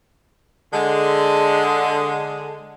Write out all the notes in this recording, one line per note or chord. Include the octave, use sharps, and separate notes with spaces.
D3 G#3